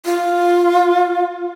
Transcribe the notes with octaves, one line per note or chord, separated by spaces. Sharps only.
F4